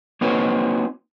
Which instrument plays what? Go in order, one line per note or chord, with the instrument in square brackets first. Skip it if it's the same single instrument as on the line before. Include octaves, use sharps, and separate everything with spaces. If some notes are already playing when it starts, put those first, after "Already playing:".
[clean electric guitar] A#3 C4 D#4 F#4 B4 C#5